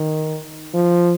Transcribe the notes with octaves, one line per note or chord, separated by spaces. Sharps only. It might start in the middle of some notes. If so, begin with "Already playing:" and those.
Already playing: D#3
F3